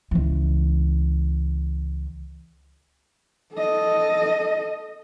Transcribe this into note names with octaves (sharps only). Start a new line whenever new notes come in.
C#2 E3
A4 D#5